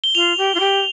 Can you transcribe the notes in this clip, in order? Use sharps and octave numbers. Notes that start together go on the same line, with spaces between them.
G7
F4 F7
G4
F4
G4